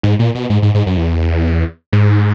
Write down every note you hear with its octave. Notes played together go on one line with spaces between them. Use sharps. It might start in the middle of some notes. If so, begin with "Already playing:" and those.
G#2
A#2
B2
G#2
G#2
G#2
F#2
E2
G#2